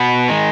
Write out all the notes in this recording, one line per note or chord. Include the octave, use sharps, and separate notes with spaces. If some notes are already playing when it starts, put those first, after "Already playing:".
Already playing: B2 B3
D#3 G#3